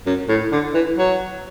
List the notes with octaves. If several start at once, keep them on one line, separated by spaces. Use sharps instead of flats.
F#2
A2
D3
E3
F#3